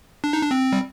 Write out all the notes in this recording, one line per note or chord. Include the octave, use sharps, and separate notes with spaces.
D4
D#4
D4
C4
G3